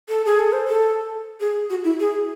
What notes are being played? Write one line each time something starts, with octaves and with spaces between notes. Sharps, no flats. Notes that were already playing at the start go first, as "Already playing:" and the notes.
A4
G#4
A4
C5
A4
G#4
F#4
E4
G#4